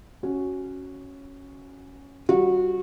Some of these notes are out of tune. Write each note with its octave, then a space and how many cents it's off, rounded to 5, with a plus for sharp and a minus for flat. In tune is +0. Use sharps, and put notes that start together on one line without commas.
C#4 -5 F#4 +0
G3 -35 F#4 -25